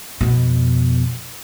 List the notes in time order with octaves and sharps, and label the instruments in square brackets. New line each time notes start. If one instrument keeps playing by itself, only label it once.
[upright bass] F2 B2